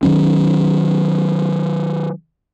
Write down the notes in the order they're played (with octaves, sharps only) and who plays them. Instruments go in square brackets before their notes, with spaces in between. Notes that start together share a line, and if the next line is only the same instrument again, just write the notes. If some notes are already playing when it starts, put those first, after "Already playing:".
[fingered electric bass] D#3 F3 F#3 C#4